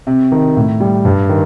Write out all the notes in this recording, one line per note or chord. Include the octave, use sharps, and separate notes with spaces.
C3
D#3
A2
G3
G2
D#3